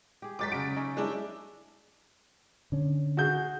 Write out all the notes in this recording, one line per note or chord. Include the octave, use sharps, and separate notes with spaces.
G4 G#4
F#3 G#3 D#4 D6 A6 B6
C#3 F#4 D7
C#4 D#4 E5
G#3 D4 E4
D3 C#4
F#4 G#4 G6